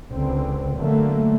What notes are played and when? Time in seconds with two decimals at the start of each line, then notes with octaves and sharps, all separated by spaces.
0.11 C#2 D3 C4
0.76 D3 F#3 A3 A#3